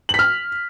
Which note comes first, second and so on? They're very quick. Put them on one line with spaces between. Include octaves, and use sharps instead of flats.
F#7 B6 F6